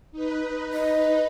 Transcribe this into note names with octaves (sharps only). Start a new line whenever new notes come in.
D#4 B4
D#5